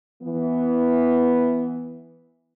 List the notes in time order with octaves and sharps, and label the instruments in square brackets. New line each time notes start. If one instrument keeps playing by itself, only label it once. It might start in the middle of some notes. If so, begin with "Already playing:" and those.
[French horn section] E3 B3